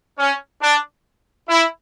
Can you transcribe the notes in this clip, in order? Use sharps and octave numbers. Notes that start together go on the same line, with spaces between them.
C#4
D4
E4